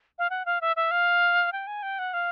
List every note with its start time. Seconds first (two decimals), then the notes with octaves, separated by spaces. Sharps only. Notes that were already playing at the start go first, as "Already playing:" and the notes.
0.19 F5
0.30 F#5
0.46 F5
0.61 E5
0.76 E5
0.91 F5
1.52 G5
1.67 G#5
1.83 G5
1.99 F#5
2.14 F5